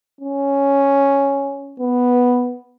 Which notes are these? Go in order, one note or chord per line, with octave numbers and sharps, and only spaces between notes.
C#4
B3